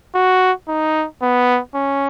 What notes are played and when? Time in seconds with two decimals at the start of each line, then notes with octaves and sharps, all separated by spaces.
0.15 F#4
0.68 D#4
1.22 B3
1.75 C#4